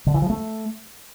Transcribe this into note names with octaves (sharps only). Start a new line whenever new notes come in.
D3
E3
F3
A3